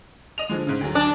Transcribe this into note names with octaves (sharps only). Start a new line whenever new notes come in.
D#5 D#7 F7
D3 F3 G#3
G#2 C#3
D2 F#3
D4